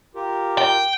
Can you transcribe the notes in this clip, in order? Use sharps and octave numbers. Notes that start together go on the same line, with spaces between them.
F4 G4 A#4
G5